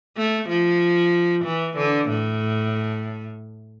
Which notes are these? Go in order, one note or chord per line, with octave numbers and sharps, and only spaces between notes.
A3
F3
E3
D3
A2